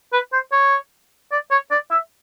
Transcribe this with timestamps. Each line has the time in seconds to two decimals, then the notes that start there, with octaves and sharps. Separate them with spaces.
0.13 B4
0.33 C5
0.52 C#5
1.32 D5
1.51 C#5
1.71 D5
1.91 E5